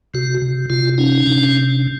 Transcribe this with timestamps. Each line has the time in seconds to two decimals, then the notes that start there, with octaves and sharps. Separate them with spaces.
0.14 C3 F#4
0.42 C3
0.70 C3 F4
0.98 C#4 D#4
1.26 C3 D4